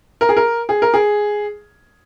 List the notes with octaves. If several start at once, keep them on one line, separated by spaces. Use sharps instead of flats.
A#4
G#4
A#4
G#4
A#4
G#4